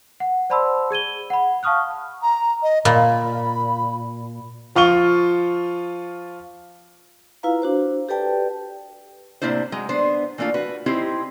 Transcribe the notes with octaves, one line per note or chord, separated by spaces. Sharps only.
F#5
C5 D5 A5 B5 C6 E6
G#4 G#6 D#7 G7
F#5 B5
F5 A5 C#6 D#6 F6 F#6
A#5
D#5
A#2 B5
F3 F4 C#6 G7
E4 F4 B4 F5 A#5
D4 F#4 C5
G4 A4 B4 D5 G5 A5
A2 C3 A#3 D4 E4 C5
F#3 G#3
B3 D4 C5
E3 A3 A#3 D4 F4
F#4 B4
C4 D#4 E4 G4 C5